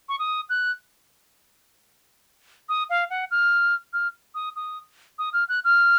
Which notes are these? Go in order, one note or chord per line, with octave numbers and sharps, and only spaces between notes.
C#6
D#6
F#6
D#6
F5
F#5
F6
F6
D#6
D#6
D#6
F6
F#6
F6